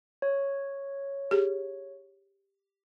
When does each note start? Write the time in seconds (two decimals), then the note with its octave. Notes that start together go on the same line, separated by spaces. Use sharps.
0.22 C#5
1.31 G4 G#4